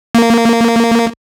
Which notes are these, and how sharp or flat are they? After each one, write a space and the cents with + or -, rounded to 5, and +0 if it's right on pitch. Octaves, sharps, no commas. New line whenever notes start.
A#3 -15